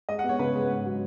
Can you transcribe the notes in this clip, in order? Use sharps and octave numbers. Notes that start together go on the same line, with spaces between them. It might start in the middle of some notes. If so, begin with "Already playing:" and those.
G#3 D#5
F#5
B3
C#5
C#3 B4
G#3
G#2
F#3